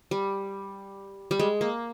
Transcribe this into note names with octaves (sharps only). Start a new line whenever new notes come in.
G3
G3
G#3
A#3